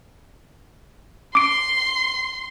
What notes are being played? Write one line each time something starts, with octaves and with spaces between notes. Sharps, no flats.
C6 D6 D7